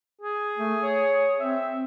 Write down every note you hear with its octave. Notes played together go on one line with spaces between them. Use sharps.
G#4
A3
C#5
C4 E5